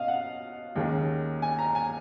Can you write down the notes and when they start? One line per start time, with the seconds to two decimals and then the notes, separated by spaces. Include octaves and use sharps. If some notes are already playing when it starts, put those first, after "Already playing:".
Already playing: B2 C#4 D#5 F5
0.08 F#5
0.76 D#2 D#3 G#3 C#4
1.42 G#5
1.59 A#5
1.75 G#5